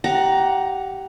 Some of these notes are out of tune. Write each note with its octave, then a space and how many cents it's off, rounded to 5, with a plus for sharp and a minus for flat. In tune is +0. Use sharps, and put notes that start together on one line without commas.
G4 -20 F#5 +0 A#5 +10